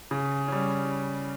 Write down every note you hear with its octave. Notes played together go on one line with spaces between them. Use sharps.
C#3
G3 C#4